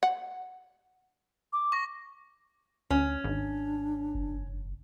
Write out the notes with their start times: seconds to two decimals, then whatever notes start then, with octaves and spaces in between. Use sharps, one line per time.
0.03 F#5
1.53 D6
1.72 C#6 A#6
2.90 D2 C#4
3.24 G#1 D4
4.15 F#1